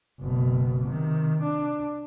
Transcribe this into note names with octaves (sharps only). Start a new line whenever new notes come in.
F#1 B2
C3 D#3
D4